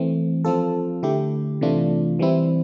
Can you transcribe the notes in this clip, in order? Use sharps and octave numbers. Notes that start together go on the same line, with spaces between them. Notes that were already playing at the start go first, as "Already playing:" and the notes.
Already playing: E3 A3 C4
F3 C4 F4 A4
D3 A3 E4 G4
C3 E3 A3 D4 F4
E3 G3 C4 E4